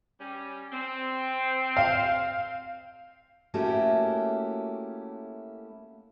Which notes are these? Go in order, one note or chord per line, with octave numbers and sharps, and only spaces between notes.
G3 C#4
C4
F5
A3 A#3 C#4 E4 F#4 G4